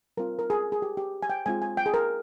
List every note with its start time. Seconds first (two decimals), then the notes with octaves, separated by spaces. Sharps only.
0.17 G3 C4 F4 A#4
0.39 A#4
0.50 G#4
0.72 G#4
0.82 G4
0.97 G4
1.23 G#5
1.30 G5
1.46 G#3 C4 F4 G#5
1.62 G#5
1.77 G5
1.86 G#4
1.94 A#4